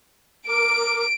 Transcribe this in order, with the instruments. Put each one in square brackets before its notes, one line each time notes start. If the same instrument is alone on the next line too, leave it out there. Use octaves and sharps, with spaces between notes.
[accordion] A#4 D6 [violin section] D7